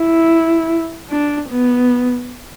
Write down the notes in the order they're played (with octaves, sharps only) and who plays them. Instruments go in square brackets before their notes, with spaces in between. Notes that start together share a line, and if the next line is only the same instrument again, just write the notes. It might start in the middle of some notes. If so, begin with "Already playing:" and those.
Already playing: [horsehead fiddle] E4
D4
B3